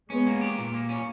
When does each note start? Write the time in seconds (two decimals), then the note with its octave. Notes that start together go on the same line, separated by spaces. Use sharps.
0.10 G#3 B3 C#4
0.26 A#3
0.41 G4
0.58 A#2
0.74 A#3
0.89 C#4